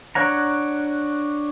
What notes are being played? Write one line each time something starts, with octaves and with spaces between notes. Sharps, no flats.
D4 C#5 F#5 A#5